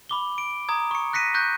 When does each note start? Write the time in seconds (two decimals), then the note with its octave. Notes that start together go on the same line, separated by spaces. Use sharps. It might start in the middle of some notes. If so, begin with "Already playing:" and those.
0.09 B5 D6 G7
0.38 D7
0.69 A#5 D#6 G#6
0.91 C#6 C#7
1.13 F#6 A#6 B6 C#7 D#7
1.34 C#6 F#6 G6 A#6